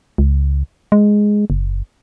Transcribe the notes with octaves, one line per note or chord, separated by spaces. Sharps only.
C#2
G#3
F#1